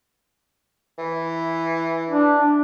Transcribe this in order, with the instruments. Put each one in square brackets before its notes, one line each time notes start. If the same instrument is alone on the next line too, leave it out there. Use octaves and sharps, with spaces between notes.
[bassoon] E3
[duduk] D4